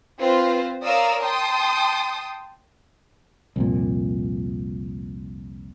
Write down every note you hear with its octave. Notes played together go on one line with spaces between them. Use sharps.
C4 F4 B4 C5
A#4 C#5 D5 F5 D#6 E6
G5 A5 C6 D#6
C2 F2 A#2